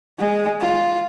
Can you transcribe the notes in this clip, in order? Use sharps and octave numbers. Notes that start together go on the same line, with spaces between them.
G#3
F4